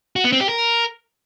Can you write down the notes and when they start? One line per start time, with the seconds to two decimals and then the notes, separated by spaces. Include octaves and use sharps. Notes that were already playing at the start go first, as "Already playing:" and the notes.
0.16 F#4
0.24 B3
0.32 C4
0.41 G4
0.49 A#4